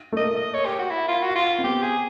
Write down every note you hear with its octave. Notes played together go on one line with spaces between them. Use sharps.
A3
A#3 D#5
D#5
C#5
G4
F#4
E4
F4
F#4
F4
C4
B3 G4
G#4